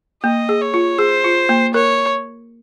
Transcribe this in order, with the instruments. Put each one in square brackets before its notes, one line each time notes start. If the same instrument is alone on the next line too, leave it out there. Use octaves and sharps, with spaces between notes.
[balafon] A#3 [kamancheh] D#5
[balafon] G#4
[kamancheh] C#5
[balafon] F4
[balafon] G#4 [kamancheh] C5
[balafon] F4
A#3
[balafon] A#4 [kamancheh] C#5